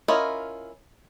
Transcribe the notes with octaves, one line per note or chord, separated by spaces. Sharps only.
C#4 E4 F4 A#4 D#5